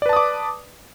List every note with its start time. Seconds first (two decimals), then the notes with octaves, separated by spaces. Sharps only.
0.02 D5
0.06 B4
0.09 A5
0.13 D#6
0.17 D6